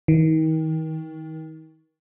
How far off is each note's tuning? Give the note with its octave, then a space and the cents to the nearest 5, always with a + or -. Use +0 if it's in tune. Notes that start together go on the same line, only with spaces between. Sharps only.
D#3 +35